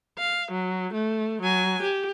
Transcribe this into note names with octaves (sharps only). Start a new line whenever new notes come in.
F5
F#3
A3
F#3 G#5
G4